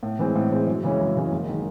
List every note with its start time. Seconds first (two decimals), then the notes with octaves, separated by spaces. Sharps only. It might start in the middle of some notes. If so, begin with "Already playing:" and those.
0.03 A2
0.19 E3 G#3 C4
0.36 A2
0.51 E3 G#3 C4
0.67 F#2
0.83 C#3 E3 G#3 C#4
1.00 F#2
1.15 C#3 E3 G#3 C#4
1.32 F#1
1.48 D#3 G#3